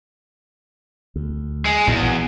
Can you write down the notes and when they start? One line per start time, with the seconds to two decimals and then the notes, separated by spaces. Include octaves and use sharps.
1.16 D2
1.66 G#3
1.87 A#1 E2 B2 E3